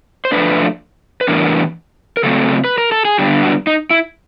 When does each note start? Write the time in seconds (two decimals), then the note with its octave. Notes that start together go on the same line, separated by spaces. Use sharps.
0.25 C5
0.32 F3 A3 D4 B4
1.21 B4
1.28 A2 E3 G3 B3 D4 A#4
2.17 A#4
2.23 C#3 F#3 A3 C4 A4
2.64 B4
2.78 A#4
2.92 A4
3.05 G#4
3.19 D3 G3 B3 D4 G4
3.43 F#4
3.67 D#4
3.90 E4